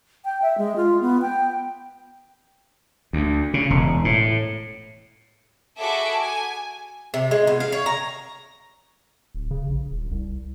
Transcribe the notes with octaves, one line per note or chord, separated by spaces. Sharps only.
G5
E5
G#3
F4
B3
G5
D2
C#3
E1
A2
F#4 G#4 A4 E5 B5 D6
G#5
C3
G#3
B2
F5
C#5
A#5
D1
C#3
A#1
D#1
C2